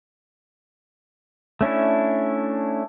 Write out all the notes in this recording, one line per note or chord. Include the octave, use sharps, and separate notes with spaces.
A3 C#4 D4 E4